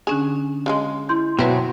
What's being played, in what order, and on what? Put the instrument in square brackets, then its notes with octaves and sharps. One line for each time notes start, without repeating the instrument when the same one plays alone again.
[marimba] D3 C#4 D4 [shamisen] G#4
[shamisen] C#3 F3 G#3
[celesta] E4 C6 G6
[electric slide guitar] B2 F#3 [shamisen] C4 [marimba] F#4 B4 E5